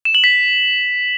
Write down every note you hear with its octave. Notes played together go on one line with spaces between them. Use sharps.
E7
F#7
B6